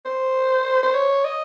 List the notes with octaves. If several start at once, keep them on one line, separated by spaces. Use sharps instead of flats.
C5
C5
C#5
D#5